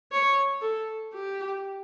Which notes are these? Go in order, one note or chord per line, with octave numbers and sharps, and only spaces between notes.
C#5
A4
G4